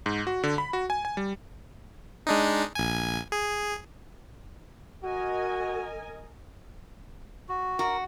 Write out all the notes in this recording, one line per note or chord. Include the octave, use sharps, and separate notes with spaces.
G#2
F#4
D3
B5
F#4
G#5
G#5
G3
G#3 D4 D#4
A#1 G#5
G#4
F#4 A#4 D#5 G#5
F#4
F#4 A#4